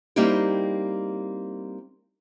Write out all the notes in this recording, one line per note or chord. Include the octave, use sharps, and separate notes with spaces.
G3 A#3 C4 D#4 E4 G4